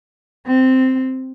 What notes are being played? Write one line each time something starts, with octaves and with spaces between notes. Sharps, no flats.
C4